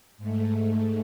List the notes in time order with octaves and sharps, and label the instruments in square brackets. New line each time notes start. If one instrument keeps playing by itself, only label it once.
[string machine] G#2 A3